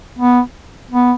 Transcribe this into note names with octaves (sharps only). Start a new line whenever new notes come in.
B3
B3